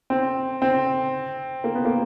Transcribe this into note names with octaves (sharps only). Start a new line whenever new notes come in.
C4
C4
A#3
B3
A#3